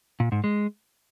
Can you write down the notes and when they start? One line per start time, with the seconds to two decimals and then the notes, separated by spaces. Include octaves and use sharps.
0.20 A#2
0.32 G#2
0.44 G#3